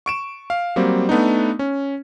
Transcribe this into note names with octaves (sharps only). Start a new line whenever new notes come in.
C#6 D7 E7
F5
F#3 G3 A#3 C4
A3 B3 D4 D#4
C#4